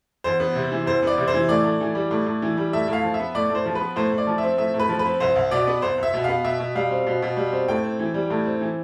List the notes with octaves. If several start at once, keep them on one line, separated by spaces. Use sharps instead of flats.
E2 C5
B3
C3
E3
E2 C5
B3 D5
C3
C5
E3
A2 D5
A2
E3
G3
A2
A2
E3
G3
A2 E5
A2 F5
F3
E5
B3
A2 D5
A2 C5
F3
B4
B3
A2 C5
A2
D5
F3
C4 E5
A2 E5
A2
B4
F3
B4
C4
C2 C5
C2
B2 D5
B3
C2 C5
C2 E5
B2
B3 F5
B2 E5
B2
G3 F5
C4
B2
B2
G3
C4
A2 G5
C4
E3
G3
A2
C4
E3